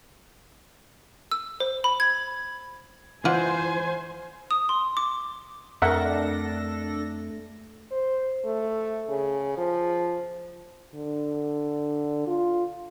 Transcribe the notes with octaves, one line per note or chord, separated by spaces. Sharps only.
E6
C5
B5
G#6
E3 F4 C5 D5 F#5 G#5
D#6
C6
D6
F2 A3 D4 A4 A#4 E5 F#5 A#6
C5
A3
C#3
F3
D3
F4